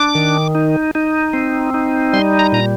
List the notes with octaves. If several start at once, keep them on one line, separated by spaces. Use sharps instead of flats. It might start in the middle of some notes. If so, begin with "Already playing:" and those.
Already playing: D4 D6
D#3
D#4
D#4
C4
D#4
G3 C6
A#5
A#2 A#5